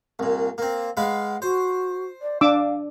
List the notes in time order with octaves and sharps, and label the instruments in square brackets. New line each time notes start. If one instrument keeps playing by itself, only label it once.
[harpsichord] C2 A#2
A#3 C4
[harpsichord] G#3 B4 F5 [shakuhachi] F#5
[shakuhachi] F#4 [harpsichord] C5
[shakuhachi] D5
[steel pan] D4 D6 E6 [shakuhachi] F5